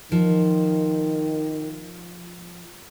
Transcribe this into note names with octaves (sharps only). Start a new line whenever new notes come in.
D#3 F3